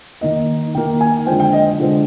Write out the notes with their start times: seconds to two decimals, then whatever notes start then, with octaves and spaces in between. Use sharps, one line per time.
0.21 D#3 A#3 D#5
0.75 D#3 A#3 G5
1.01 G#5
1.26 D3 F3 G#3 C4 G5
1.40 G5
1.53 D#5
1.80 D3 F3 G#3 C4